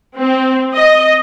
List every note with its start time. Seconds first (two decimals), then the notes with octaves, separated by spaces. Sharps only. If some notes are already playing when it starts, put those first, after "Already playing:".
0.17 C4
0.74 D#5